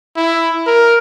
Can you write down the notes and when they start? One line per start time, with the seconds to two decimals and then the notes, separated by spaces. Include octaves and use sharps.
0.16 E4
0.66 A#4